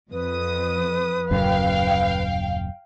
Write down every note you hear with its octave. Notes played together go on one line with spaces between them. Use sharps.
F2 B4 D#6
D#1 F#2 C#3 F5 G5